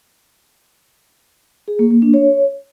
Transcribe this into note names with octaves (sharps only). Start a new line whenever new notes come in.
G#4
A#3
A#3
D4
C#5